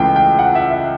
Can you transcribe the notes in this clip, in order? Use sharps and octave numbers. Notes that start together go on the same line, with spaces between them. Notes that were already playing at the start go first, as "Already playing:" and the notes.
Already playing: C#2 C#3 E3 A3 G5
G5
F#5
E5
E5